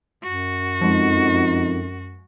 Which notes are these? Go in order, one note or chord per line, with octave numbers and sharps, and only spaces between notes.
F#2 F#4
F2 F3 G#3 D#4